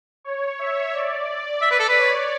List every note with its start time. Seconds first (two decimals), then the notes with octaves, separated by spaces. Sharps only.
0.24 C#5
0.59 E5
0.94 D5
1.62 E5
1.71 B4
1.80 A4
1.89 B4
1.98 C#5